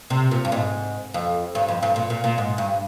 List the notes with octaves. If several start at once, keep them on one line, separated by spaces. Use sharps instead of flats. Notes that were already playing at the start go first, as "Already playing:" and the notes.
C3
A#2
G2
G#2
F2
G2
F2
G2
A#2
A#2
A#2
G#2
G2